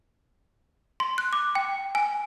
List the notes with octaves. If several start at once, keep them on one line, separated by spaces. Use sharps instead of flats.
C6
F#6
D6
G5
G#5